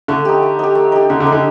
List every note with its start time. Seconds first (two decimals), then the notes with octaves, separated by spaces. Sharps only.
0.08 D3 A3
0.25 D#4 G4
0.42 A3
0.59 D#4 G4
0.75 A3
0.92 D#4 G4
1.10 D3 A3
1.20 D3
1.26 D#4 G4
1.32 D3